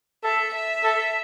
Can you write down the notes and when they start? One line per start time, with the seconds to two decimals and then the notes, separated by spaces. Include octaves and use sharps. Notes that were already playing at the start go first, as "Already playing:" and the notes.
0.23 A4 E5
0.54 E5
0.83 A4